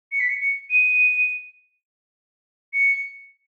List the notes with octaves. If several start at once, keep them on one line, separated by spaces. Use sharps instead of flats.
C#7
B6
C#7
C#7
D#7
C#7